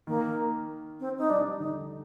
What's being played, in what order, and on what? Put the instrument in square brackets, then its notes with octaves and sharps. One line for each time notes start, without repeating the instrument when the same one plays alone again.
[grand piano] D#3 [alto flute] A#3
[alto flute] C4
D#4
[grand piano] G3 [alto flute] D4
[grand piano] D3 [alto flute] D#4